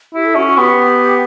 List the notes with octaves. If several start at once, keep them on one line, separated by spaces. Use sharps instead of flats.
E4 G4
A4
C#4 F#4
F#4
B3 G4